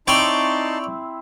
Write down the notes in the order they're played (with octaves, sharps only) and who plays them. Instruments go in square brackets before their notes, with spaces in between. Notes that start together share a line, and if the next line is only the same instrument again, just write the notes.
[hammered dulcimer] C4 E4 [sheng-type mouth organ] D#4 A5 C6 [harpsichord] C#5 D5 G5